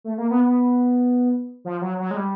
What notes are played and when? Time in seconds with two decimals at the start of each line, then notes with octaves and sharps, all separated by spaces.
0.04 A3
0.18 A#3
0.31 B3
0.45 B3
1.65 F3
1.81 F#3
2.00 F#3
2.11 G#3
2.17 G3